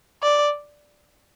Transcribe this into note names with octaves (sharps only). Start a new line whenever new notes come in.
D5